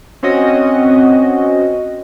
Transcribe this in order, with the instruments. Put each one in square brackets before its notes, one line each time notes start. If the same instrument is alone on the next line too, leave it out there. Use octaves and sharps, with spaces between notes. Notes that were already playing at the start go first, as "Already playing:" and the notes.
[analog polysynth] C4 C#4 F#4 D#5